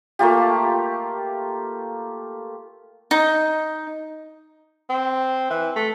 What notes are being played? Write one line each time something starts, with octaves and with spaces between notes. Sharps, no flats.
A3 A#3 F4 G4
D#4
C4
E3
A3